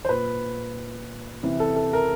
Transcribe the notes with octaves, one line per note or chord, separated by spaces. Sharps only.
C5
A#2 B4
C3 E3
A4
A4
A#4